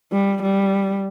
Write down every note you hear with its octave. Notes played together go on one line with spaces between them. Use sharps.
G3
G3